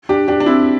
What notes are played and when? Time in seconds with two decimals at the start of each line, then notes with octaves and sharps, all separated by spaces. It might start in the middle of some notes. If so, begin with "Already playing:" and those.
0.09 D4 G4
0.28 D4 G4
0.40 D4
0.46 C4 E4